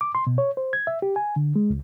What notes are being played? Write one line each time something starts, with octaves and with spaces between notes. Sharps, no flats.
D6
C6
B2
C#5
C5
G#6
E5
G4
G#5
D3
G#3
C#2